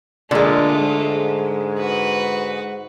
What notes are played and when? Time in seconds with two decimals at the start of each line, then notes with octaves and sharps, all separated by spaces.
0.31 A#2 D3 G#3 A3 F4
0.77 G#2
1.78 F#4 B4